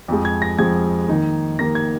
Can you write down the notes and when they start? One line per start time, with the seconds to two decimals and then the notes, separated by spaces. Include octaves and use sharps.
0.08 F2 F3 G#3
0.25 G#6
0.42 A#6
0.58 F2 F3 G#3 G#6
1.09 D#3 A#3 D#4
1.58 D#3 A#3 D#4 A#6
1.75 G#6